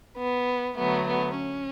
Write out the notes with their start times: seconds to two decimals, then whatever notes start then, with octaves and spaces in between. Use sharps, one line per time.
0.17 B3
0.77 D3 F#3 A3 B3
1.07 B3
1.36 C#4